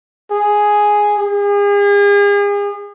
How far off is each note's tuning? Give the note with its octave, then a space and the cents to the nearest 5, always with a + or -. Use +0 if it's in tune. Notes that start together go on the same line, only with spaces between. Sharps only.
G#4 +0
G#4 -40